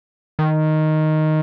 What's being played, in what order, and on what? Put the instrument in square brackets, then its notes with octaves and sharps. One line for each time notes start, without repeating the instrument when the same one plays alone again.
[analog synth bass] D#3